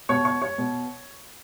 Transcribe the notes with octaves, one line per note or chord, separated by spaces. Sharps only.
B2 C#5 C#6
C#5 C#6
C#5 C#6
B2